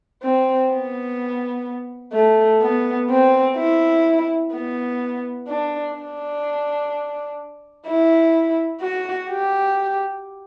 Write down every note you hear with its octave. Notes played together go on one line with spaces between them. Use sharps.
C4
B3
A3
B3
C4
E4
B3
D4
D4
E4
F#4
G4